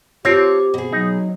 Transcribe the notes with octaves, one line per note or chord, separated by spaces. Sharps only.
C4 F4 G4 C#5 A5
B2 G#4
F#3 D#4